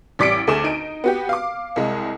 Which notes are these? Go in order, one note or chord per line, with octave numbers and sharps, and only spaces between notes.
A1 G3 D6 B6 C#7 D7
D2 A3 G#4 D6 E7
D#4 D7 D#7
B3 F#4 G4
F5 D6
C2 G#3